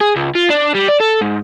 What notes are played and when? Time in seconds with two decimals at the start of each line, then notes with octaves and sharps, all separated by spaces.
0.01 G#4
0.16 C#2
0.35 F4
0.50 D4
0.75 G3
0.89 D5
1.01 A4
1.21 G#2